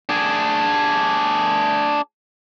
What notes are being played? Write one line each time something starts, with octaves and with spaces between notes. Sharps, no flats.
D4 G#4